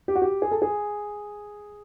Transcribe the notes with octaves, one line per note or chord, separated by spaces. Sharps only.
G4
F#4
G4
G#4
A4
G#4